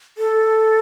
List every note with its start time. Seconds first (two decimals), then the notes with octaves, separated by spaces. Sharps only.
0.18 A4